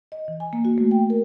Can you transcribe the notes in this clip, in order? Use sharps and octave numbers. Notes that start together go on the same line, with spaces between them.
D#5
E3
G#5
A#3
F#4
A3
G5
A#4